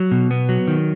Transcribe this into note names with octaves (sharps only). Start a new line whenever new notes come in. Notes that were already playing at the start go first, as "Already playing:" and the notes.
Already playing: F#3
B2
B3
F#3
D#3